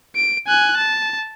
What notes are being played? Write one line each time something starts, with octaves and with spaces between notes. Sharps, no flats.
D7
G#5 F#6
A5